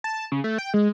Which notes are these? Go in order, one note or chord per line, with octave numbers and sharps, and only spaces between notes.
A5
C#3
A3
G5
G#3